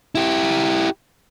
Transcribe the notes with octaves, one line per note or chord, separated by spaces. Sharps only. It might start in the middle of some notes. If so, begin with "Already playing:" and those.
E4 G4